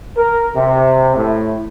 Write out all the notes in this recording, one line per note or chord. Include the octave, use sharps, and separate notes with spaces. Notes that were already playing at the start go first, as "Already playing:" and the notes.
A#4
C3
A2